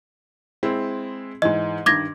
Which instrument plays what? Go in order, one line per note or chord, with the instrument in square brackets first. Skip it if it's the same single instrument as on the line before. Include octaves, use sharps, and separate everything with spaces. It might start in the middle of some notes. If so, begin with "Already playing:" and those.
[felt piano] G#3 C4 E4
[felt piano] G#2 E3 [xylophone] D#5
[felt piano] G2 D#3 [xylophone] D6 G#6 A#6